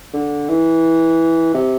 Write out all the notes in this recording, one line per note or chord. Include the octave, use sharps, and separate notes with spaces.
D3
E3
C3